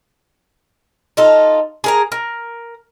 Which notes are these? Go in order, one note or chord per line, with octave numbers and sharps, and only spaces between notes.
D#4 F4 A4
G#4 A#4 A#5
A#4